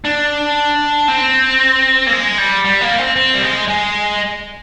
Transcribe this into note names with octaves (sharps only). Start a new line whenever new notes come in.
D4
C4
A#3
G#3
G3
G3
A#3
C4
C4
G3
G#3
G#3